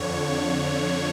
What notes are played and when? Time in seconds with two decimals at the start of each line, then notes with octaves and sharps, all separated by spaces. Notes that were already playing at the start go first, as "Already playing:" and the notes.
Already playing: F2 D3 C#5